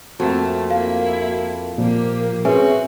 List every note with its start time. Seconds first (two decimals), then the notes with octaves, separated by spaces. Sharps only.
0.20 F2 A3 A#3 F#4 A#4
0.71 A#3 E4 F5
1.78 A#2 F3 A#3 G4
2.45 C4 C#4 F#4 G#4 B4 E5 G#5